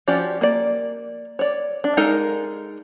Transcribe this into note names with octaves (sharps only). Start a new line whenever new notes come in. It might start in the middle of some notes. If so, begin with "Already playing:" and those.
F3 C#4 F#4 G4 D5
A#3 D5
C#5 D5
D4
G#3 D#4 A4 A#4 F5